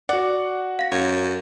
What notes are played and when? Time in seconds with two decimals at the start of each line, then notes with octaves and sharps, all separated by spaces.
0.09 F#4 D5 F#5
0.79 F5 A#6
0.92 F#2 C#5